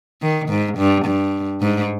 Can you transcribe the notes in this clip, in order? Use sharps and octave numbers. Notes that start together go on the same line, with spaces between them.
D#3
G#2
G2
G2
G#2